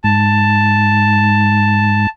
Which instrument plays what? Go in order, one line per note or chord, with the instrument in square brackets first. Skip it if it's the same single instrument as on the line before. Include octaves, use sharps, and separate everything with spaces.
[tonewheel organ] G#2 [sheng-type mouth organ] A5